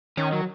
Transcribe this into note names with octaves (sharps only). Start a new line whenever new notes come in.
D#3 C#4
F#3